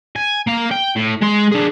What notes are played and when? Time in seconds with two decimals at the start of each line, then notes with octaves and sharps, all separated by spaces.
0.16 G#5
0.47 A#3 F5
0.71 G5
0.96 A2
1.22 G#3 C6
1.52 D4 G#4